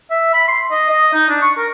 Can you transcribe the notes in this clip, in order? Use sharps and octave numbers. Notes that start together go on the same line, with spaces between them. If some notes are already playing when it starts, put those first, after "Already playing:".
E5
B5
C6
D#5
D#5
D#4
D4
C#6
A#4